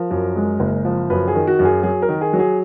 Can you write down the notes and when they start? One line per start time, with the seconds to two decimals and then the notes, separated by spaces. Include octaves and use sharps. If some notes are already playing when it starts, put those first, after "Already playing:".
Already playing: F3 A#4
0.11 F#2
0.36 G#3
0.60 F#1
0.85 F3
1.10 F#2 B4
1.28 G#4
1.35 D#3
1.47 F#4
1.59 F#2
1.65 G#4
1.83 F#3 G#4
2.02 A#4
2.09 D#3
2.21 G#4
2.33 F#3
2.39 G#4